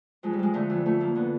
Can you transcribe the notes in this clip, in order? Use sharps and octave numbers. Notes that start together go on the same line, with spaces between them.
F2 G#3
G3
F3 G#3
D3 A3
F2
F2 A3
F3 A#3
D3 B3